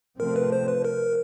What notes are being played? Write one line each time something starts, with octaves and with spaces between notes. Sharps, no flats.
C3 F3 A3 C4 A#4
B4
C5
B4
A#4